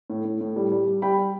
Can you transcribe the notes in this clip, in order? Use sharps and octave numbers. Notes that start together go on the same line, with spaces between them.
A2
A2
A2
G3
G3
G3
G3 G5 B5
G3